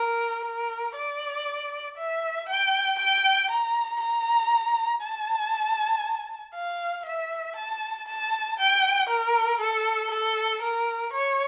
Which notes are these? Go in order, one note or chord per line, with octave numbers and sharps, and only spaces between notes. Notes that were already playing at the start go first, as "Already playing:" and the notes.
Already playing: A#4
A#4
D5
E5
G5
G5
A#5
A#5
A5
F5
E5
A5
A5
G5
A#4
A4
A4
A#4
C#5